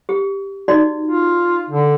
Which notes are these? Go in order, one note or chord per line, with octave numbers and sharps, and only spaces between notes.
G4
D#4 F#4 D5
F4
D3